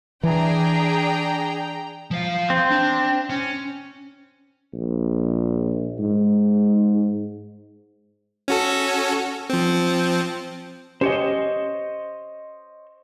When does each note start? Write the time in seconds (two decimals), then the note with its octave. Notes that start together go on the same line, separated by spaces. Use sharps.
0.23 E3 D4 G#4 G5 A#5
2.11 F3 F5
2.50 C4
2.71 D4
3.30 C#4
4.74 A#1
5.99 G#2
8.48 C#4 F#4 A4
9.50 F3 C4
11.01 C#4 G4 C5 C#5 D#5